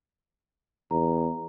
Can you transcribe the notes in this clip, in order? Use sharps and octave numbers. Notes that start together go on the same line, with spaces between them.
E2 A#5